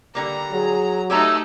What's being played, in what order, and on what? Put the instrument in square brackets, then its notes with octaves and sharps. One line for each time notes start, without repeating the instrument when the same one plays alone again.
[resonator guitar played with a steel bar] D3 G3 A#3 [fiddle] A#5
[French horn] F#3 [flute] G#4
[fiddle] A3 D#4 [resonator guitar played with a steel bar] G4 C#5 A#5 [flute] E6